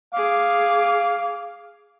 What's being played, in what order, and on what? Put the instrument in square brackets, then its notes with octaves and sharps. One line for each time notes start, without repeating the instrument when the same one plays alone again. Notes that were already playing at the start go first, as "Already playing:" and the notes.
[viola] G#4 D6 [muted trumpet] F5